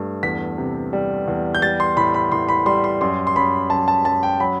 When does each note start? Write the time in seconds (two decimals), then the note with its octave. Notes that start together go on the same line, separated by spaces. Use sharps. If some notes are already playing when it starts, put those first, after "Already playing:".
Already playing: G2 A3
0.23 E2 B6
0.58 C3
0.93 G3
1.28 E2
1.55 G6
1.62 G3 A6
1.80 C6
1.97 A2 B5
2.14 B5
2.32 A2 C6
2.49 B5
2.66 G3 C6
2.84 C6
3.01 F#2 C6
3.27 C6
3.36 F#2 B5
3.70 F#2 A5
3.88 A5
4.05 F#2 A5
4.23 G5
4.40 F#3 B5